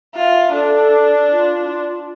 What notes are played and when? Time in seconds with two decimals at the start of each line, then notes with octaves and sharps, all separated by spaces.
0.15 F4 E5
0.53 D4 A4
1.32 F4
1.70 F4